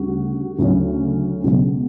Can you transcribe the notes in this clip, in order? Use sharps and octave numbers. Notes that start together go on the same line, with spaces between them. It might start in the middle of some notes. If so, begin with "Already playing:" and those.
Already playing: D2 C#3 G3 F#4
D2 C#3 F#3 C#4
C#2 B2 F#3